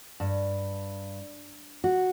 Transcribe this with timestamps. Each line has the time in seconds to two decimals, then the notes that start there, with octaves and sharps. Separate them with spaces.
0.20 G2
1.84 F#4